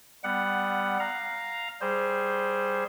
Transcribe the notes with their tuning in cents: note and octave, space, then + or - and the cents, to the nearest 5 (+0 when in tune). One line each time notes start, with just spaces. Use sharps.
G3 +10 B3 +15 F#5 +5
F5 +0 A#5 +0
G3 -5 G#4 +0 C5 +0